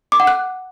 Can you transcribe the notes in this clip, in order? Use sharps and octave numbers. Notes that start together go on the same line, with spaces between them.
D6
F#5
F#6